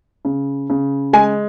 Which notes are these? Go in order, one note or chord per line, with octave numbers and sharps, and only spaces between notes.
C#3
C#3
G#3 G#5